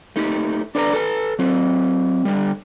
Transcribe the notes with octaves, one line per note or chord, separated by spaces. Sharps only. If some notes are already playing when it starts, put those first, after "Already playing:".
A3 D#4 G4
D4 A4 B4 D5 A#5
A4 B4 A5
F#3 C4
D3 G3